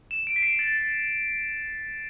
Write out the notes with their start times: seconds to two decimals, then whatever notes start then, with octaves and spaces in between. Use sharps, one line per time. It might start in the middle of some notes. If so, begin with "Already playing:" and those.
0.11 E7
0.27 D7
0.36 B6
0.42 C7
0.59 A6